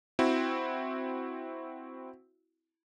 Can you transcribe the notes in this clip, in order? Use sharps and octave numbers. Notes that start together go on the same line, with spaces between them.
C4 E4 F#4